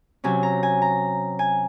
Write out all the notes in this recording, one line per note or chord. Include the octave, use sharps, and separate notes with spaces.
C3 F#3 C#4 G#5
A#5
G#5
A#5
G#5